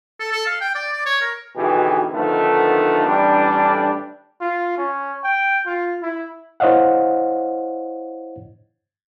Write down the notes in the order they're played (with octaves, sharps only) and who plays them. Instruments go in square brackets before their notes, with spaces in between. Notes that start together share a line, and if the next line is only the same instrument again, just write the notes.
[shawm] A4
A4
F5
G5
D5
D5
C#5
A#4
[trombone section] D2 B2 D#3 E3 G4 G#4
D3 D#3 F3 A3 B3 D#4
A1 G3 D4
[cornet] F4
C#4
G5
F4
E4
[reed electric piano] E4 C5 C#5 D#5 F5 F#5